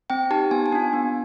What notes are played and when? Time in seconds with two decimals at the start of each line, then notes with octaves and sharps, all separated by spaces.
0.10 C4 G5
0.31 D#4 G4 A5
0.51 B3 G#5
0.66 G#5
0.72 D4 F4
0.93 B3